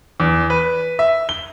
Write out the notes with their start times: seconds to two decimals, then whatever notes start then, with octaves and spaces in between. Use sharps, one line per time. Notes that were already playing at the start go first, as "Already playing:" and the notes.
0.20 E2
0.50 B4
0.99 E5
1.29 G7